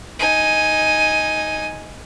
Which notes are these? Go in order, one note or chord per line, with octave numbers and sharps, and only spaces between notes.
D#4 G#5